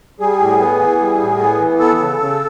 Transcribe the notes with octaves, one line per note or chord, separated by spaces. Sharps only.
G3 G#4
A2
B3
E3
G3
A2
B3
E3
B3 A4
C#3
C#3